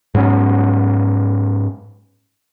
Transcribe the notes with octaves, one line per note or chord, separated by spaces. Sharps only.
G#2 F#3 B3 C#4